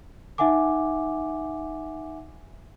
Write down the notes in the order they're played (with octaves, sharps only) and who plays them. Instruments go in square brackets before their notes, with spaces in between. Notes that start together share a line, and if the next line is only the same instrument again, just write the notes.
[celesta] D#4 E5 F#5 G#5 D6